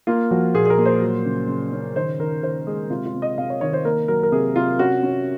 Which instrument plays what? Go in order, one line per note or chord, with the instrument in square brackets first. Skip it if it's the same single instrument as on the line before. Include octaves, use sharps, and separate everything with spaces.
[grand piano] A#3 F4
F3 F#4
A#2 G#4
G#4
A#4
A#3
C5
F#3
C#3
C#3
C#4
D#3 C5
D#3 A#4
D#3 C5
G#3 G#4
C3 F4
F4
C3
D#5
C3 F5
C#5
D#3 C#5
C5
A#3 A#4
F#3 A#4
A#4
C3 G#4
C3 F4
C#4 F#4
C#4